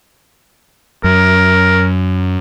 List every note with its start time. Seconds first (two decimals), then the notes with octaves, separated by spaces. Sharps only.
1.04 F#2 A#4